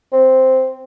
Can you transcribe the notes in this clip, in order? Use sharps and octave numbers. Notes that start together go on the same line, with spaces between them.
C4